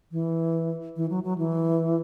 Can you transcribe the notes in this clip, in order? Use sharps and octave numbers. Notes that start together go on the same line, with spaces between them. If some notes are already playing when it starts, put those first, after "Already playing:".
E3
E3
F#3
F#3
E3